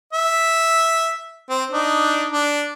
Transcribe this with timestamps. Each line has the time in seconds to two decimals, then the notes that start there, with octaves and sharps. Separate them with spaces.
0.13 E5
1.49 C4
1.71 D4 D#4
2.32 D4